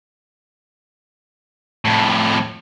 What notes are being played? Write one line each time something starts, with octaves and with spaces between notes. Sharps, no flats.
F2 A2